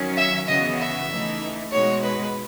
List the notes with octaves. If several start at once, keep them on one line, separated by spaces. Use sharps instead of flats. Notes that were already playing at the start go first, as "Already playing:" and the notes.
Already playing: D#3 F#3 C#4
E5
C#3 E3 B3 F#4 D#5
E5
E3 A3 D#4
B2 G#3 D#4 F#4 C#5
B4